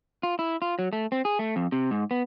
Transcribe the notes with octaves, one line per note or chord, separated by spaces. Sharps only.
F4
E4
F4
F#3
A3
C4
G#4
A3
F2
C3
G#2
B3